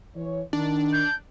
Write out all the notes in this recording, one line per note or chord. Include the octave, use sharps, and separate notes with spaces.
E3 C#5
D#3 D4
G6